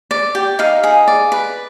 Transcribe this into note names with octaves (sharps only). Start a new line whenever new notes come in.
D5
G4
D#4 F5
G#4
D5
B4